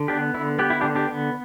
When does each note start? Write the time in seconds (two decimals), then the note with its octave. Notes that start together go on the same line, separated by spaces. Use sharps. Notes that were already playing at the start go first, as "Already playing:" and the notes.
Already playing: D3
0.08 B3 D4 G4
0.34 D3 E4
0.59 B3 G4
0.70 E4
0.81 D3 D4 G4
0.95 D4 G4
1.09 B3